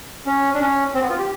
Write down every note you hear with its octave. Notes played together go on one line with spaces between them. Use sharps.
C#4
D4
C#4
C4
B3
F4
G4